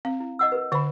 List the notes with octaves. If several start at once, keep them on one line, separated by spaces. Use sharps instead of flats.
C4 F5
E4
D#5 F#5 E6
A#4 B4
D3 B4 F#5 B5